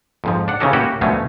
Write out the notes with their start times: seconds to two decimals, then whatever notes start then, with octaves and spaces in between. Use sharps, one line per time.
0.24 F2 G#2 F3
0.48 D4 F#5
0.60 C#3 E3 C#4 D#4 G4 A4
0.73 A#3 C#4 E4 F#4 G4 C#5
1.01 D2 B2 F3 F#3 A3 C#4